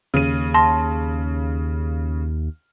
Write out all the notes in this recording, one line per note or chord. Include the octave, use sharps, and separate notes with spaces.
D#2 C#3 D#7
A5 C6 A#6